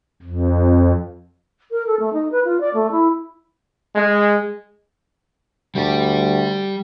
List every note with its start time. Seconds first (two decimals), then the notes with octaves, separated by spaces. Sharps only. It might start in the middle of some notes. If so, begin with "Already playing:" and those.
0.23 F2
1.71 A#4
1.87 A4
1.99 A3
2.13 D#4
2.31 B4
2.44 F4
2.60 D5
2.74 A3
2.91 E4
3.95 G#3
5.75 D2 G3 G4